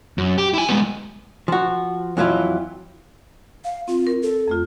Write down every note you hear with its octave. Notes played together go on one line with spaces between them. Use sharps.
F#2
G4
E4 G#5
G#3 B3
F3 F#4
F2 E3 F#3 E4 F4
F5
C4 F4
A#4
A4
F2 A3 F4